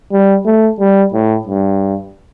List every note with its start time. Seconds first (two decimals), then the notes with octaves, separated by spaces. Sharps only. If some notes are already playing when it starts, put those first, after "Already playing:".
0.12 G3
0.46 A3
0.80 G3
1.14 A2
1.47 G2